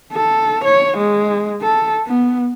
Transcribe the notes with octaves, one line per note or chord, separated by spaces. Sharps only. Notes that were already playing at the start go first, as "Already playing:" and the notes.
A4
C#5
G#3
A4
B3